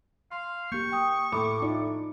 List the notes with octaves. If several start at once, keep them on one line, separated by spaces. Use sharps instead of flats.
F5 C6
A#3 G4 C#6 G6
G5 D#6
A2 B5 D6
D#4 F4 D5